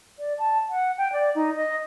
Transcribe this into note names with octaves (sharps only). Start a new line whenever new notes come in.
D5
A5
F#5
G5
D5
D#4
D#5